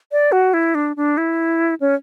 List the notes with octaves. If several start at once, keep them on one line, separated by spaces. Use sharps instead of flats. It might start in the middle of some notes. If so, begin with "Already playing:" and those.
D5
F#4
E4
D4
D4
E4
C#4